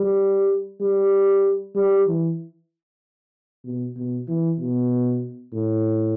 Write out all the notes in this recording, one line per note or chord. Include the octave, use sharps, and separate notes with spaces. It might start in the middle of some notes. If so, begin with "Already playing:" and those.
Already playing: G3
G3
G3
E3
B2
B2
E3
B2
A2